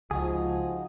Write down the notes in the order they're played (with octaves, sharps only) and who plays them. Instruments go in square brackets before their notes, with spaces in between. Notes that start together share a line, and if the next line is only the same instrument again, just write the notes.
[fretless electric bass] C#2 [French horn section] F3 [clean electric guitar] D#4 F#4 G#4